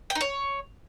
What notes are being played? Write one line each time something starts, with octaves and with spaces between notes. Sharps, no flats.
G5
D#4
C#5